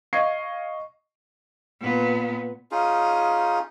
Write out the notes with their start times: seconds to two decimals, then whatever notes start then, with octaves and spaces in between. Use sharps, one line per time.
0.13 D#5 F5 C#6 G#6 C7
1.81 A#2 B3
2.71 C#4 D#4 F4 G#4